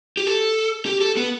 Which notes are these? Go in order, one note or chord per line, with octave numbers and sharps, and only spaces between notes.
G4
A4
G4
A4
B3